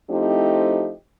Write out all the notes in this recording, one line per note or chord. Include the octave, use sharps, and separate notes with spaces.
F3 A3 C4 D#4 E4 G4